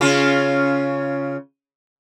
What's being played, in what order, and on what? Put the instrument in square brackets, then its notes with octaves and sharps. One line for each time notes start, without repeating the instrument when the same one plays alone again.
[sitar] C#3 C#4 F4